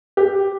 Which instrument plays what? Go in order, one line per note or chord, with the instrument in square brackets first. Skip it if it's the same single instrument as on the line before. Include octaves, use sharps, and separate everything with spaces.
[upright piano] G4